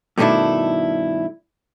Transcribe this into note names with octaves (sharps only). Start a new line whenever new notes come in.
G2 B2 D#3 A3 D4 E4